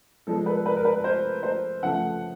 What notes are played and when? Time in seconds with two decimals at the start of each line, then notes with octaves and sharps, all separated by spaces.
0.27 F3 G#3 B3 A4
0.46 B4
0.66 B4
0.76 A#4
0.85 B4
1.04 C5
1.43 C5
1.83 C#3 F3 A3 F#5